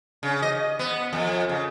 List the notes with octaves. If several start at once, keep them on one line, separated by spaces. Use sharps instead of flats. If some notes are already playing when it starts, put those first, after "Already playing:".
C#3
D#5
B3
F2
C#3